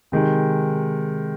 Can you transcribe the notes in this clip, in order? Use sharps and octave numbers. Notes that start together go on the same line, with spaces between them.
C3 D#3 G#3